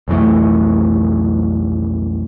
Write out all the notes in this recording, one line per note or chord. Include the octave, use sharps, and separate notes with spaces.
B1 F2 E3 A3